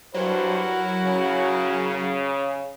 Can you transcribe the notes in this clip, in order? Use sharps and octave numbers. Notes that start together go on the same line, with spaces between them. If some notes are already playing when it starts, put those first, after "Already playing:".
G2 F#3 E4 F#4 A#4 C5
C#3